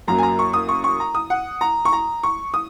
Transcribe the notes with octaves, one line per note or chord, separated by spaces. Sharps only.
F#2 F#3 A#3 A#5
G#5
A#5
C#6
D#6
C#6
C#6
A#5
D#6
F#5
A#5
C#6
A#5
C#6
D#6